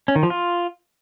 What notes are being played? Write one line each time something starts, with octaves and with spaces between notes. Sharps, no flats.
C#4
D#3
F3
F4